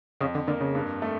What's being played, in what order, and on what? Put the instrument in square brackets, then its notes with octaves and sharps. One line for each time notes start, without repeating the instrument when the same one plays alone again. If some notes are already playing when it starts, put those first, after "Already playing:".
[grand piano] F2 [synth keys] C#3
[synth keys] D3
[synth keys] D3 [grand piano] A#3
[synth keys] C#3
[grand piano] G2
A3